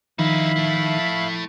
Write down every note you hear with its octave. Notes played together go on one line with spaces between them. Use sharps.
D#3 F3 D#4 E4 E5 F5 B5
A3 E4